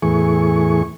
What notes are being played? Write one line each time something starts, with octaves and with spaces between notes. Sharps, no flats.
E2 A2 E3 G#4 C#6